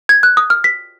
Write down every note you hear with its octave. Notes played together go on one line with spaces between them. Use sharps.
G#6
F#6
D#6
F6
B6